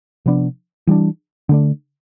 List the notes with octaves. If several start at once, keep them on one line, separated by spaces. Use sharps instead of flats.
C3 F3 B3 D4
E3 G3 D4
D3 A3 D4